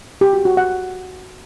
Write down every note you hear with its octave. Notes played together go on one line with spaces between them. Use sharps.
G4
F#4
F#4
F#5